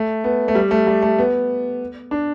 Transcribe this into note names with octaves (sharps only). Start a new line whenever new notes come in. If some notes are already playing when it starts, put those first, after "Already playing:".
Already playing: A3
B3
A3
G3
A3
G3
A3
B3
D4